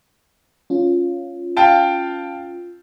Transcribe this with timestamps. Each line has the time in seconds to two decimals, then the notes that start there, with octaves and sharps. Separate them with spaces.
0.70 C#4 F4
1.57 F5 G5 A5